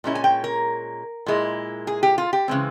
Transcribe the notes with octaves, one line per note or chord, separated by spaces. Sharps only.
A#2 G#3 C#4 E4
G#5
G5
A#4
A#2 G#3 E4
G#4
G4
F4
G4
C#3 E3 G#3 C4